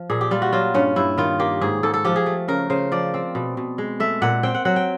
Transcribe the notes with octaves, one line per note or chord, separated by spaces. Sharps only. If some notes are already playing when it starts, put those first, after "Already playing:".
Already playing: F3
A#2 G#4
G4
G3 F4
F#4
F#3 F4
G2 C#4
G2 E4
D#3 F4
A#3 G4
G#2 G#4
G#2 A4
A4
F3 G4
G#4
A3
C#3 A#4
C#3 C5
F3 D5
C4
B2
B2
G#3
A3 E5
A#2 F#5
C4 G5
F#5
F#3 F#5
G5